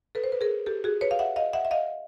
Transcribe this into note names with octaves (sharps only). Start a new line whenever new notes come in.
A4 B4
C5
B4
G#4 A#4
G4 A4
F#4 G#4
B4 C#5
F5
E5 F#5
D#5 F5
E5 F#5
E5
D#5 F5